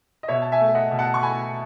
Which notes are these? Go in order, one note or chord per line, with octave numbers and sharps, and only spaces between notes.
D#5
B2 C#5 E5
A5
E5 G#5
A3
D#5 F#5
B2
F#5 A5
C#6
A3 G#5 B5